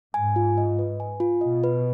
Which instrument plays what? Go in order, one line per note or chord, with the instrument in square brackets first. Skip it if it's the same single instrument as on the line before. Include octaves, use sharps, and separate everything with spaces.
[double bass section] G#2 [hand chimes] G#5
[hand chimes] F4
D#5
B4
G#5
F4
[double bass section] B2 [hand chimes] D#5
[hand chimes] B4